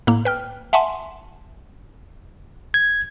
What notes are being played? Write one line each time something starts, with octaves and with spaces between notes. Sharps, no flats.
A2 A#3
B4 G5 F6
E5 F#5 G#5 A5 C6
G#6